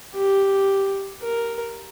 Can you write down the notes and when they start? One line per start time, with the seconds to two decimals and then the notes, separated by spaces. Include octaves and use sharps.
0.15 G4
1.22 A#4